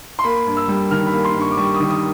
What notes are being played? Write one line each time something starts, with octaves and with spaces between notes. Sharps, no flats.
C6
A#3 B5
G2
E6
G3
D#3 F6
B5
A#3
C6
G2
C#6
D6
G3 C#6
D#6
D#3
D#6